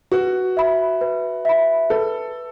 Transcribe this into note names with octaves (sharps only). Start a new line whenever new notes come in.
F#4 B4
E5 B5
B4
E5 B5
A4 B4